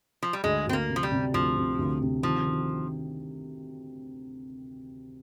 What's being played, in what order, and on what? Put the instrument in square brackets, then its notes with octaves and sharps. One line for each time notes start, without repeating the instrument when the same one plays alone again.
[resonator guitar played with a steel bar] F3
G3
[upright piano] D2 [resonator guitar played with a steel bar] G#3
[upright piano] D2 [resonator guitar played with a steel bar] C4
[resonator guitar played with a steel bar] A#3
[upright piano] C3
[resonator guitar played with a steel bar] F3
G3
[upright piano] C3
[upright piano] D2 [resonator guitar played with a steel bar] F3
[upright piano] C3
D2
C3
[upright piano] D#3 [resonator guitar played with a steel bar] F3
[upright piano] D#3